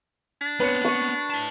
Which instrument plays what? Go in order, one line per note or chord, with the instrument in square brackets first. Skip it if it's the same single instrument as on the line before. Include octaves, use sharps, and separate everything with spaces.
[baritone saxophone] D4
[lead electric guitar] B3 C4 [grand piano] B4 C#5 C#7
[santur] C#6
[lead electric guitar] E4 A5